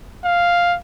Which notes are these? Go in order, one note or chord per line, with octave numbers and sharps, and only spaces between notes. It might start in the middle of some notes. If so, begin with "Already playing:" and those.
F5